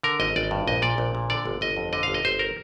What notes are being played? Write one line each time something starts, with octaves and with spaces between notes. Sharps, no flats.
D3 A#4
G#1 D#5
G#1 D5
G2
A#1 D#5
A#2 D5
A#1
A#2
D3 D5
G1
G1 D#5
F2
D3 D#5
G1 F5
D#5
G1 C5
A#4